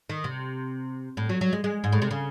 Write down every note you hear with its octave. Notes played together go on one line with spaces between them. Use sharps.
D#3
C3
A2
F#3
F#3
G#3
G#3
G#2
A2
C3
C#3